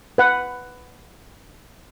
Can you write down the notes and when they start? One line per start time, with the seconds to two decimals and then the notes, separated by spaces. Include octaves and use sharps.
0.18 B4 F#5